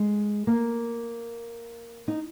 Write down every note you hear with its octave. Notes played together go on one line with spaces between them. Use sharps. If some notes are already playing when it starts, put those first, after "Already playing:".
Already playing: G#3
A#3
D#4